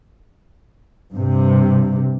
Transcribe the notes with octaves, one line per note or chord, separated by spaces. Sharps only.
G2 C3